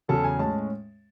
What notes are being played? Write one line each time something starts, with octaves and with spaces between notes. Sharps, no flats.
E2 C#3 F#3 A4
G#5
A2 G#3 C#4 A5